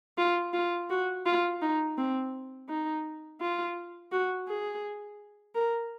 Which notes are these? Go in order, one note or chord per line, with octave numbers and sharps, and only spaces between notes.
F4
F4
F#4
F4
D#4
C4
D#4
F4
F#4
G#4
A#4